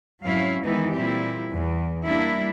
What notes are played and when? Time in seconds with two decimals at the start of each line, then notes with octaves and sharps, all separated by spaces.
0.24 F2 G#2 F#3 C#4 E4 F5
0.62 D#3 E3 G#3 B3 D#4 E4
0.92 A#2 G3 C4 E4 G4
1.53 E2
2.06 G3 A#3 D4 E4